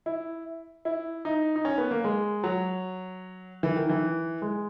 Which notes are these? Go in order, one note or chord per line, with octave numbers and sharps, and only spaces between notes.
E4
E4
D#4
D#4
C#4
B3
A#3
G#3
F#3
E3
D#3
E3
G#3